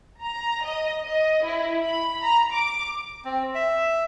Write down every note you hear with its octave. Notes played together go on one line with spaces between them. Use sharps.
A#5
D#5
D#5
E4
B5
A#5
D6
C4
E5